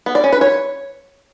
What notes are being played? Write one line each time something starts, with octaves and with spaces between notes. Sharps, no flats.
B3
D5
C#4
B4
C#5